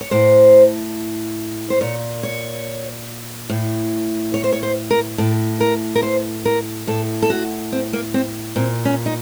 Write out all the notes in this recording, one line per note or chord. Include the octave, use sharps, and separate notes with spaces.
C#5
A2 C5
C5
A#2 C#5
C#5
A2
C#5
C5
C#5
C5
A#4
A2 A4
A#4
A#4
C5
A#4
A2 A4
A4
F#4
C4
A#3
C4
A#2 C4
C#4
D#4